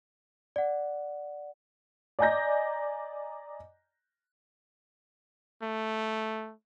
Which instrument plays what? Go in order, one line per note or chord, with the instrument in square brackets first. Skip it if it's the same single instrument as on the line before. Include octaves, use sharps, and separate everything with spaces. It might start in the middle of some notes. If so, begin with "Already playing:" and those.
[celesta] D5 F#5
[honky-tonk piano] D5 D#5 G#5 A#5 G6 A#6
[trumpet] A3